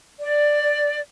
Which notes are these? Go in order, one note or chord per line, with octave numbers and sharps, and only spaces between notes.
D5